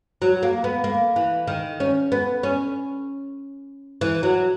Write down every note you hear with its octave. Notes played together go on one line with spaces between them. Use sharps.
F#3
A#3
B3
A#3
E3
D#3
C#4
B3
C#4
E3
F#3